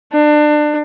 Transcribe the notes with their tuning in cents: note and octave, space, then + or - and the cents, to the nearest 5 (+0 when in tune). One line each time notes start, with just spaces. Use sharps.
D4 +25